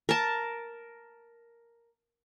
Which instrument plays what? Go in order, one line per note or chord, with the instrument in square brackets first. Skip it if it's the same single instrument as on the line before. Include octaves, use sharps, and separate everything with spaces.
[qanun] A#4 A5